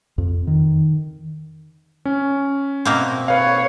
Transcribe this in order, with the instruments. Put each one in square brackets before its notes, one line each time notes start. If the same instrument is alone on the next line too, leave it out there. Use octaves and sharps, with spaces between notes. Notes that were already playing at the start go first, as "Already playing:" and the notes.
[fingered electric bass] F2
D#3
[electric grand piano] C#4
[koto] B2 A#3 C4
[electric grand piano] B4 F5 [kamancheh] C#5